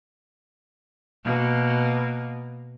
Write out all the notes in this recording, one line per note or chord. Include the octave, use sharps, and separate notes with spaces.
B2 A#3